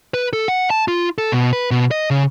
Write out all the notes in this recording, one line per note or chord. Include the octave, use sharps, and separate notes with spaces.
B4
A4
F#5
A5
F4
A4
B2
B4
B2
D#5
C#3